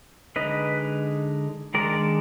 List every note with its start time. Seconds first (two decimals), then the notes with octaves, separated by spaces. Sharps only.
0.36 D3 G#3 D#4 B4 D#5
1.74 D#3 G#3 D4 A#4 D5